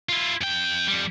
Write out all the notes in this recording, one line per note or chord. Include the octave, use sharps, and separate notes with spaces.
E4 F4
F2 G5
F2 G3